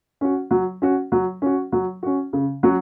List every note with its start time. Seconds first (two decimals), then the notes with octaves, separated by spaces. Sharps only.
0.21 C#4 F#4
0.51 F#3
0.82 C#4 F#4
1.12 F#3
1.42 C#4 F#4
1.72 F#3
2.03 C#4 F#4
2.33 C#3
2.63 F#3 C#4 F#4